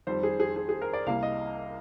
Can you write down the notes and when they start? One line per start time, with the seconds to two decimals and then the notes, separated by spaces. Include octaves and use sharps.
0.07 F2 D#3 G3 C4 C5
0.23 G#4
0.40 G#4
0.56 G#4
0.69 G#4
0.82 A#4
0.93 D5
1.06 C2 C3 G3 A#3 F5
1.23 D#5